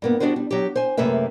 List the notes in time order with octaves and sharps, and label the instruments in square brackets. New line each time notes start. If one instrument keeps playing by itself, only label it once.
[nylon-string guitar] G2 A#3 B3
G3 B3 D4 F#4 B4 C5
G3
F#3 G4
C5 G#5
F#2 C3 A3 A#3 B4 E5